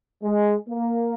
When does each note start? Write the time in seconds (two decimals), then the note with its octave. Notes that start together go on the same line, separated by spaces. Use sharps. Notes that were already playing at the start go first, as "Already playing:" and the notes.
0.22 G#3
0.69 A#3